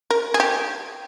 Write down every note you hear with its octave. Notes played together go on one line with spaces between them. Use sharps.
A#4
G#4
G4